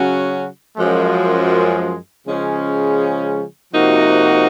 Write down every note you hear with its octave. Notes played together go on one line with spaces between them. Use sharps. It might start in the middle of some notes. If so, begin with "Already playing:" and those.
Already playing: C#3 F#3 C#4 F#4
F#2 F3 G#3
C#3 F3 G#3 C#4 G#4
C3 F3 A#3 D#4 F#4